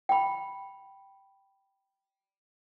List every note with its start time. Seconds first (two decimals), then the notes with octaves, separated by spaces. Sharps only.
0.09 G5 B5